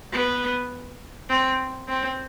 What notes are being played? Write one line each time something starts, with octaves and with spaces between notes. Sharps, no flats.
B3
C4
C4